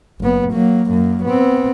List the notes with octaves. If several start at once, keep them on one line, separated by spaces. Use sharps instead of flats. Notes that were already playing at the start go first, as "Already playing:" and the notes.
F#1 B3
F#3 A#3
F#2 A#3
B3 C4